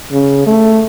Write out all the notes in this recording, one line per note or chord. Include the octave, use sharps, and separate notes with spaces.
C#3
A3